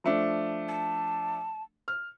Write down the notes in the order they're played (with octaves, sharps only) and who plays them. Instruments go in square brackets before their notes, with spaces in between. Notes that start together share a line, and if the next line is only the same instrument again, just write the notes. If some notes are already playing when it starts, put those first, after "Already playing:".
[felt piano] F3 A3 D4
[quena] A5
[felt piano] F6